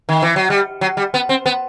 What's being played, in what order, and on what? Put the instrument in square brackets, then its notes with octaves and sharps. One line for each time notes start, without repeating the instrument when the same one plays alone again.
[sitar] D#3
E3
F#3
G3
F#3
G3
B3
C4
B3